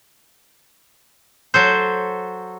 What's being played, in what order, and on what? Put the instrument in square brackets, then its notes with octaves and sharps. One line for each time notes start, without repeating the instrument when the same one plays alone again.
[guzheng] F#3 A4 C5